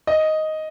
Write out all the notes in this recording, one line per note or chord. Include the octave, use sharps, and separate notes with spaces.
D#5